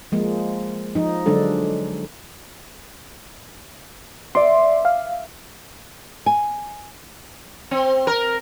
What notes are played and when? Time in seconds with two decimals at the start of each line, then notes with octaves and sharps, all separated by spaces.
0.12 F3 G#3 A#3
0.95 F3 D#4
1.26 D3 F#3 G#3 D4 A4
4.35 D5 E5 C6 D6
4.85 F5
6.26 G#5
7.71 C4
8.07 A#4